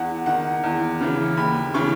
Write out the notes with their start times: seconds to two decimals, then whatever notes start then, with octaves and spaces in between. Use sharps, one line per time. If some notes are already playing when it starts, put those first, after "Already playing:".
Already playing: E2 F#5
0.26 D#3 F#5
0.64 E2
1.01 C#3 E3
1.37 D#2 B5
1.74 C#3 E3 C#6